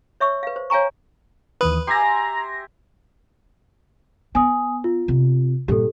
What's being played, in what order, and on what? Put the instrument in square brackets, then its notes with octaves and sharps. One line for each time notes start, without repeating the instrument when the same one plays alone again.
[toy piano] C#5 E5 C#6 E6
B4 F5
C5
C#5 F5 G#5 A#5 C#6
[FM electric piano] D#2 E3 D#6 [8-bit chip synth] B4
[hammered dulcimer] G4 E5 G#5 [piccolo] A#5 [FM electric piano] C6 A#6
[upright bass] B3 [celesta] G#5 D#6
[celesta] F4
[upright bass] C3
[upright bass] G2 A#2 [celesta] G4 A4